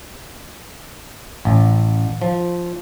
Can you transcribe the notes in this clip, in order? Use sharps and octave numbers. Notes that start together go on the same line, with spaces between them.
A1
F3